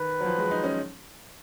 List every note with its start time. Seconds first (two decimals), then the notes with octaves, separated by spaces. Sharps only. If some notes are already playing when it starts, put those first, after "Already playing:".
Already playing: D#3 B4
0.21 F#3
0.25 F3
0.38 G#3
0.51 D#4
0.64 C#4